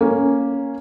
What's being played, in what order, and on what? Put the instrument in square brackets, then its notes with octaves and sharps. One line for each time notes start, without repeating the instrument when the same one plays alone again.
[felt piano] A#3 C#4